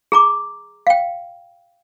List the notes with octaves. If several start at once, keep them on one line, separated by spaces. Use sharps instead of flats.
G#4 A#5 D6
F5 G5